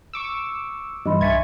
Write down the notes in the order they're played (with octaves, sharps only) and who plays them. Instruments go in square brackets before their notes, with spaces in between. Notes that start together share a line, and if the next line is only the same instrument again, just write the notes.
[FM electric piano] C#6 D6 E6
[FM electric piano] G2 [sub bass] E3 [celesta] D#5 B5 C6
[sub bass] B1 [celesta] E5 A6 B6 [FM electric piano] G#5 C#6 G#6